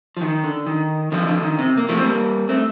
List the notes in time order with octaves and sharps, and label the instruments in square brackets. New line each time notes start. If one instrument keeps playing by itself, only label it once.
[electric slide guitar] F3
D#3
D3
D#3
D3 F3
D3 F3
D#3
C3
A#3
F3 A3
C4
G3 A#3
A3 C4